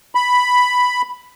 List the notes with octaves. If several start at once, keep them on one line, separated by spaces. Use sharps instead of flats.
B5